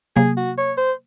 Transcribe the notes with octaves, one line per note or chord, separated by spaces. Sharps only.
C3 F#3 A#3 G#4
F#4
C#5
C5